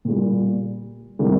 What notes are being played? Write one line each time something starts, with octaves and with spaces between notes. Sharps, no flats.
A#2 G3
C3 D#3 G3